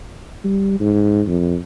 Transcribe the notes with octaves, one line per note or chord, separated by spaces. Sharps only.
G3
G#2
F2